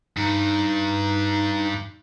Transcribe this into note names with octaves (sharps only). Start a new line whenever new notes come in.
G2 D#4